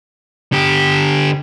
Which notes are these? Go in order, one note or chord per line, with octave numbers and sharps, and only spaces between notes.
D3 G4